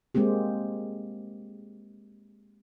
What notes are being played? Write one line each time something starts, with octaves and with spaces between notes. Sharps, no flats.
G#3 A#3 C4 G4